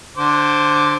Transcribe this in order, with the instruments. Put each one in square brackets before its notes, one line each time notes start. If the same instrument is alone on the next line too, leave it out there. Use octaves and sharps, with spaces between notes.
[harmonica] D3 C5 D6